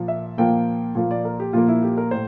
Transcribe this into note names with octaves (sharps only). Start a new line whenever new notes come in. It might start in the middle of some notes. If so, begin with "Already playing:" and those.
Already playing: A#2 F3 A#3
E5
A#2 F3 A#3 G5
A#2 F3 A#3
D5
A#4
G4
A#2 F3 A#3 F4
E4
G4
A#4
A2 C5